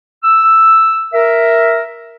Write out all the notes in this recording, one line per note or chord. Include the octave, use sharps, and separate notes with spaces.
E6
A#4 E5